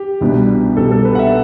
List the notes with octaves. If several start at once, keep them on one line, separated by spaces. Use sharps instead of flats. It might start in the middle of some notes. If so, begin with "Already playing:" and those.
Already playing: G4
C2 B2 G3 B3 D4
C2 B2 G3 B3 D4 A4
A4
B4
F#5
E5